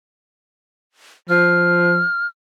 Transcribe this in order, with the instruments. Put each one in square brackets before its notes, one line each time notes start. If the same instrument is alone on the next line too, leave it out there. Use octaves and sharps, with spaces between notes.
[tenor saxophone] F3 [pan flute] F6